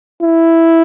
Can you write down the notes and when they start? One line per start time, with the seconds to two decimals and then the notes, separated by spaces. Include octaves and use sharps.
0.22 E4